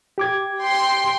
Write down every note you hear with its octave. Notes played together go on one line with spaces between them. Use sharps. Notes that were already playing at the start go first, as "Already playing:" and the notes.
G4 D6 G#6
G5 C6